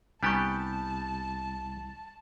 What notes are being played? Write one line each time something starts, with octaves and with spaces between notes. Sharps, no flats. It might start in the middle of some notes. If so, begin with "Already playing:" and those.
C2 G3 B3 D4 G4 A5 A#5 C#6